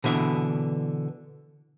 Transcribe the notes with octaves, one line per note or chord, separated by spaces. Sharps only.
B2 D3 E3 E5